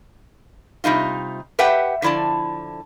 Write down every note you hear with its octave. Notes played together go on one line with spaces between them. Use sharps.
C3 G3 D#4 F4
G4 B4 E5 F#5 G5
D3 F3 E4 D5 A5